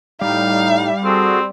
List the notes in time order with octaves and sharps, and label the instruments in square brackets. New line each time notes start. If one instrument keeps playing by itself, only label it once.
[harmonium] A2 D#4 [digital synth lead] G3 [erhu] F5
[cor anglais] C4 [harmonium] F#4 G#4 A4